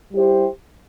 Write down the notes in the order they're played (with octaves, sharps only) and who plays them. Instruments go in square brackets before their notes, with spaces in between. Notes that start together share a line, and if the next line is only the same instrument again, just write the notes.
[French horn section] G3 E4 G4 C5